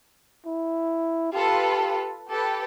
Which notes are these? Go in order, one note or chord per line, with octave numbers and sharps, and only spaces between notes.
E4
F4 G4 A4 B4
G4 A4 B4